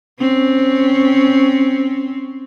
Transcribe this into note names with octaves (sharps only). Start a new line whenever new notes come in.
C4 C#4